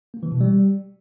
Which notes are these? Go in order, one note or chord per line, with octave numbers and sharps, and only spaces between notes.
A#3
E3
B2
G3